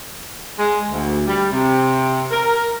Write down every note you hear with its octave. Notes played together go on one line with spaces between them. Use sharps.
G#3
D2
G3
C3
A#4